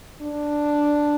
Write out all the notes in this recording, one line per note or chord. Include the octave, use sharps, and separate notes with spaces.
D4